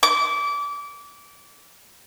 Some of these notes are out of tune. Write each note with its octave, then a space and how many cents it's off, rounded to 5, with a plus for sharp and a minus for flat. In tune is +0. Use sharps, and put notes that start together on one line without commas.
D6 -25